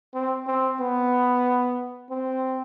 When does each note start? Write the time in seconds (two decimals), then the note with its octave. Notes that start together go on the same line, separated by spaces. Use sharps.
0.14 C4
0.47 C4
0.80 B3
2.10 C4